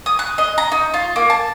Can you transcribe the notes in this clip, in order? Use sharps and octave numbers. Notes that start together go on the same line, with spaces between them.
D#6
F#6
D#5
A#5
D#4
F4
A#3
A5